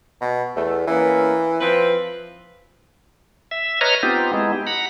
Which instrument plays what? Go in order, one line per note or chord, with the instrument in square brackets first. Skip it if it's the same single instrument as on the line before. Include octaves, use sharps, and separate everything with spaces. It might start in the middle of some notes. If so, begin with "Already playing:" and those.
[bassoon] B2
[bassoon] E2 [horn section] A3
[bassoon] E3 [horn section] A#3 B3 C#4
[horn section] F3 C4 B4
[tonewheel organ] E5
B4 C#5 D#5 A#5 F6
B3 C4 D#4 F4 G4
G#3 B3 D#4 E4
G4
F#5 A#5 B5